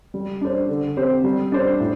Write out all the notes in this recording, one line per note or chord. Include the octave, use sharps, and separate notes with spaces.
G3
D4 C5
D3
C4 G4 C5
G3
D4 C5
A2